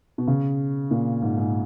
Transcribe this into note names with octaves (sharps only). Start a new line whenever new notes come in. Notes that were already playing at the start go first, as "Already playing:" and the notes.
B2
C#3
A#2
G#2
G#2